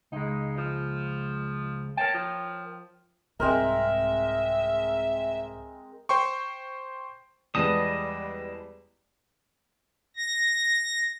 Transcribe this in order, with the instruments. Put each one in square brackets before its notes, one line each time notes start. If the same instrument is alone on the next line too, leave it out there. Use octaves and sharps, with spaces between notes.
[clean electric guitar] C#2 G#3 [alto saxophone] D#4
[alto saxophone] F3
[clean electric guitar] A#4 C#5 G5 [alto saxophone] A5
[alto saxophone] F3
[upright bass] C2 G#2 [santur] G#3 C4 A#4 [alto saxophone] E5
[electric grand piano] C5 G5 C6 C#6
[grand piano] E2 G#3 B3 [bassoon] G3 [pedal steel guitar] D#5 A5 D#6
[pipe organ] A#6